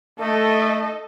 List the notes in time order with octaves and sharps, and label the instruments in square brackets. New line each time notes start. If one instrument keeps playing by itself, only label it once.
[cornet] A3 [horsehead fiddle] A4 D#5